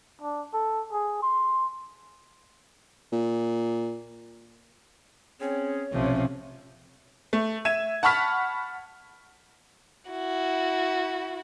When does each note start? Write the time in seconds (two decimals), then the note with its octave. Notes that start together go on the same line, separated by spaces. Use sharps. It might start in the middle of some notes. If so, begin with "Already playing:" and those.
0.21 D4
0.54 A4
0.92 G#4
1.22 C6
3.12 A#2
5.40 C4 C#4 G#4 C#5
5.93 B1 C3 F3 A3 C#4
7.33 A3
7.65 E5 G#6 D#7 E7
8.03 F#5 A5 B5 C#6 F6 B6
10.10 E4 F#4